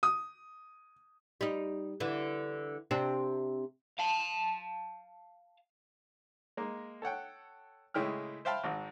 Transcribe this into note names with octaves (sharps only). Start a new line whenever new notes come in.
D#6
G3 D#4
D3 E3
C3 C4 D4
F5 A5
G#3 A#3
A4 C#5 F#5 G5
A2 C#3 G#3 E4 G5 F6
C5 E5 F5 G5 A5 B5
G#1 G#2